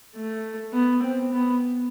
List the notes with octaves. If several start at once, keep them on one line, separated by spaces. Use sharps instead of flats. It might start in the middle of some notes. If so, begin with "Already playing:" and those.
A3
B3
C4
B3